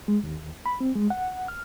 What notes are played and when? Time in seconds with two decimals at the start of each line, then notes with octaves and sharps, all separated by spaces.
0.08 G#3
0.23 D#2
0.66 B5
0.80 C4
0.95 G#3
1.10 F#5
1.48 F6